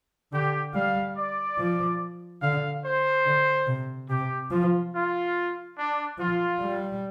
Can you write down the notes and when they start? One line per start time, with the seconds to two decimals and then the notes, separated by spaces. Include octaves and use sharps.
0.32 D3 G4
0.74 G3 F5
1.16 D5
1.58 F3
2.41 D3 F5
2.84 C5
3.26 D3
3.67 C3
4.09 C3 G4
4.50 F3 F4
4.93 F4
5.77 D4
6.18 F3 F4
6.60 G3